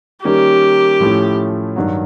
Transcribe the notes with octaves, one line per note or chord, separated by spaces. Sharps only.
D#3 G3 A#3 C#4 G4
A2 F3 A3 C#4 E4
G2 D#3 F#3